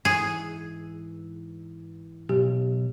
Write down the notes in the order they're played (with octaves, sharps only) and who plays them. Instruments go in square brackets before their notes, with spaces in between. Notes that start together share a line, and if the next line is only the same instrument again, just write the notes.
[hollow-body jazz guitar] G#2 E3 [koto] G#4
[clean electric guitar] B1 [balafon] G4